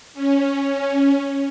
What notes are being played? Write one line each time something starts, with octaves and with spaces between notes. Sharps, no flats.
C#4